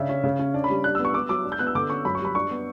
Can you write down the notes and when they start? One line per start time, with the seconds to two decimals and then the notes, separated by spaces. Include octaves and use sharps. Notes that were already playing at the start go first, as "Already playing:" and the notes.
Already playing: C#3 D4 E5
0.09 C#4
0.24 C#3
0.39 C#4
0.54 D4
0.64 B5
0.70 G3
0.84 D4 F#6
0.95 E6
0.99 B3
1.05 C#6
1.14 B3 D6
1.29 F#3 D6
1.44 D4
1.52 G6
1.59 B3 F#6
1.67 E6
1.75 D3 D6
1.90 C#4 C#6
2.05 F#2 B5
2.15 C#6
2.20 G3 B5
2.35 D4 C#6
2.51 B3